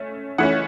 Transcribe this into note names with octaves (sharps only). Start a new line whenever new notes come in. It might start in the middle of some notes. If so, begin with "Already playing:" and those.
Already playing: A3 C#4
E3 A3 C#4 F#5